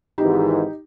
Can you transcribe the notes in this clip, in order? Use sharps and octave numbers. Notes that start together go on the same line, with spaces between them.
G#1 G#2 E3 D#4 G4